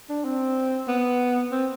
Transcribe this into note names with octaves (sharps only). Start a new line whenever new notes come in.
D4
C4
B3
C4